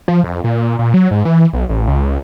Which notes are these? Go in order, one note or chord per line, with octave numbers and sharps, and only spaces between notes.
F3
F2
A#2
A#2
F#3
G#2
E3
B1
A1
C#2
C#2